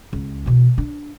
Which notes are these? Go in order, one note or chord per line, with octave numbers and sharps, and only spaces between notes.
C#2
B2 E3
D4